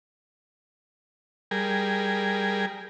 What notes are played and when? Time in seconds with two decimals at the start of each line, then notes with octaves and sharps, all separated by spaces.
1.51 G3 G#4 A#4